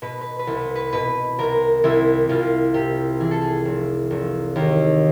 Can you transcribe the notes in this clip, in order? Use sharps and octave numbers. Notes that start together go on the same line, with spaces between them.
B2 B4
B4
B4
C2
B4
B4
B2 B4
C2 A#4
C2 E4
C2 F4
C3 G4
E3 G#4
A4
G#4
F1
F1
D#2